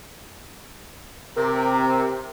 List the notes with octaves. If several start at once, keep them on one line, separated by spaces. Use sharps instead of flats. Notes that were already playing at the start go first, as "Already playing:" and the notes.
C3 A#4